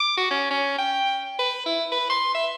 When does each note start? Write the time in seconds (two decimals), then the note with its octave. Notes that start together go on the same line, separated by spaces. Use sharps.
0.01 D6
0.18 F#4
0.31 C#4
0.51 C#4
0.79 G5
1.39 B4
1.66 E4
1.92 B4
2.10 C6
2.35 E5